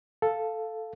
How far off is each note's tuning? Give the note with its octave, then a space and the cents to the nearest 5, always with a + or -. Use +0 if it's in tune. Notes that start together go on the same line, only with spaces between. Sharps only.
A4 +0 F5 +0